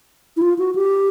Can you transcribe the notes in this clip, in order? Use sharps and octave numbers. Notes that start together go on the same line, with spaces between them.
E4
F4
F#4
G4